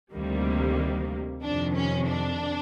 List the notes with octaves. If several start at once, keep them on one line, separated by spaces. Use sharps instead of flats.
D2 C3 D#3 G3 A#3
F2 C3 D#3 D4
C#4
D4